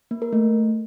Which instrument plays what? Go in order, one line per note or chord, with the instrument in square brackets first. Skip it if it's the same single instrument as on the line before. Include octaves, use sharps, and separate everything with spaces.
[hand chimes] A#3
A#4
A3